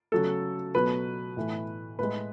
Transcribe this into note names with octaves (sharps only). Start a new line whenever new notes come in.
C#3 F#3 A3 A4
B2 F#3 A3 B4
A2 E3 A3
A2 G#3 B4